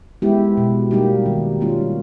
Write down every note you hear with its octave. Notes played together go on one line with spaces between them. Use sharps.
G#3 B3 E4 G4
B2
G3 A#3 D#4 G4
D#3
G3 A#3 C#4 F4